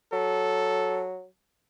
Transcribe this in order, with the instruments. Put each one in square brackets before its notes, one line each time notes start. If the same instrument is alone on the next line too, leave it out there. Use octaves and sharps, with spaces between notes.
[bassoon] F#3 [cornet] A4